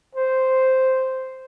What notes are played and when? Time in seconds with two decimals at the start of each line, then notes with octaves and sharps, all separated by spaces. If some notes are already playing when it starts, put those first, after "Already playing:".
0.15 C5